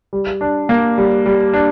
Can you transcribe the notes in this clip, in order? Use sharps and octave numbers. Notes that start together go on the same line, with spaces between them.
G3
D4
A#3
G3
G3
D4